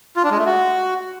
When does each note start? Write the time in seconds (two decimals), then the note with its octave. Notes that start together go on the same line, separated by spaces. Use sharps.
0.16 F4
0.24 D4
0.31 G#3
0.38 A3
0.46 F#4